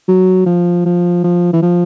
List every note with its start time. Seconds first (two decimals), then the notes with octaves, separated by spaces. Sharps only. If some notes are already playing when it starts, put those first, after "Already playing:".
0.08 F#3
0.46 F3
0.86 F3
1.24 F3
1.53 E3
1.62 F3